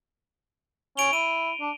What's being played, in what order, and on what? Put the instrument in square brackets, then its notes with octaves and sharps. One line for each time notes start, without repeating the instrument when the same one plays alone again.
[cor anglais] C#4 [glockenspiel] D7 F7 G7
[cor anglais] E4 [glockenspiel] D#7
[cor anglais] D4